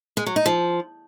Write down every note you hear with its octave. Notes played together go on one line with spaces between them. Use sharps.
G#3
F#3
D#4
F3